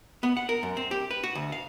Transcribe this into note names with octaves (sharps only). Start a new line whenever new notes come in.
B3
F#5
A#4
F#2
C4
G4
B4
F#4
D2
F5